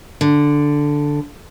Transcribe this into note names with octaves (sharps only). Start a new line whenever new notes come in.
D3